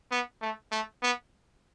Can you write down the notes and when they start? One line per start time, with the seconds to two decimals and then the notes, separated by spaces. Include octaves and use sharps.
0.11 B3
0.41 A3
0.71 A3
1.02 B3